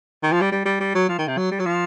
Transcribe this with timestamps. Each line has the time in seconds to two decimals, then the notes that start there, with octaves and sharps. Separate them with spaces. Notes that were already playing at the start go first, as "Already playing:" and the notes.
0.23 D#3
0.33 F3
0.41 G3
0.52 G3
0.65 G3
0.80 G3
0.95 F#3
1.09 F3
1.18 D#3
1.28 C3
1.37 F#3
1.51 G3
1.60 F#3
1.66 F3